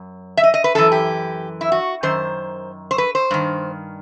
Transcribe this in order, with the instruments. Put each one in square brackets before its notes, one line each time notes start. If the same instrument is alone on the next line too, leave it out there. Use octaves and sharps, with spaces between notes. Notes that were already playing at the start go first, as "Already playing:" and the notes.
Already playing: [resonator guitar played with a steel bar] F#2
E5
D#5
D#5
B4
F#2 E3 A4
G4
E4
F#4
F#2 D#3 C5
C5
B4
C5
G2 D#3